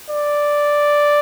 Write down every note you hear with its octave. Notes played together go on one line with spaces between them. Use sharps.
D5